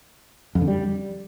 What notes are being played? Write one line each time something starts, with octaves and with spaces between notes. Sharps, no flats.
F2
D3
G3